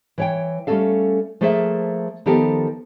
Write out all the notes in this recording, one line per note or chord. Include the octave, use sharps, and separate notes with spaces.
E3 C#5 G5
G3 A3 C#4 D#4 A4 F5
F3 A3 A#3 G#4 C5 E5
D#3 F3 B3 G4 A4 A#4